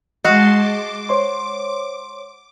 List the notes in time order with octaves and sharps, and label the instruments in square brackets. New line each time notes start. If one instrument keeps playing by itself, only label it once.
[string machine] G#3 A5 C6 [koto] F#4 F5 [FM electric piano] D#5
[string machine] D6
[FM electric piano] C5 C#5 C6